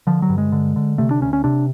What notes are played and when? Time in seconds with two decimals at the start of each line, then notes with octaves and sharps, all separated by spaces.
0.07 D3 F3
0.22 F#3
0.29 G2
0.38 G#3
0.52 D3
0.76 D3
0.98 C3 A3
1.11 D4
1.21 D2 C#4
1.33 C#4
1.44 C3 D4